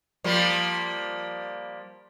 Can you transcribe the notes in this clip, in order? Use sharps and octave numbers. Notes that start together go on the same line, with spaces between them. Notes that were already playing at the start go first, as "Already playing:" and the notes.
F3 G3 A#3